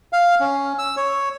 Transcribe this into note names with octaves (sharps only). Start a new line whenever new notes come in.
F5
C#4
E6
C#5